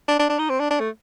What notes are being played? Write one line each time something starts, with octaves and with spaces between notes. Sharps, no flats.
D4
D4
D4
D#4
C4
D4
D4
A3